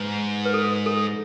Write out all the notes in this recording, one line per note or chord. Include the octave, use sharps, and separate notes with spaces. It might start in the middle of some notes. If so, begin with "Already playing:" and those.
Already playing: G#2 B4
B4
A4
A4